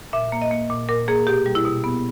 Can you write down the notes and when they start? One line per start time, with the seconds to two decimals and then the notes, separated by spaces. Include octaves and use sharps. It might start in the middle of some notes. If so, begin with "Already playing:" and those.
0.13 A#2 E5
0.32 A#3
0.42 D#5
0.51 A#3
0.70 A#2
0.89 A#2 A#4
1.08 A#3 G#4
1.27 B2 G4
1.46 G3
1.55 E4
1.65 B2
1.84 B3